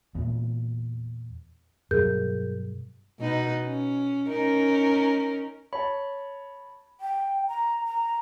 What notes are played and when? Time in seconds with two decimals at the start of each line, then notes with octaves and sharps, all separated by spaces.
0.15 E2 A#2
1.91 G2 B2 F#3 G#4 A#4 G6
3.20 B2 D#4 B4
3.63 C#4
4.28 C#4 D#4 A#4
5.73 C#5 A5 B5
7.01 G5
7.48 A#5
7.85 A#5